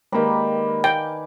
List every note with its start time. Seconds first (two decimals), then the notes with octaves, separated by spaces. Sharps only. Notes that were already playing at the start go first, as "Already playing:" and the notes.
0.12 D#3 G#3 A#3 G4 B4 D5 G5 A#5
0.84 F5 G5 G#5 D6